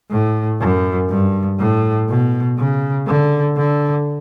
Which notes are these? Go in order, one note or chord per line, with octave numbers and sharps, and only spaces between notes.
A2
F#2
G2
A2
B2
C#3
D3
D3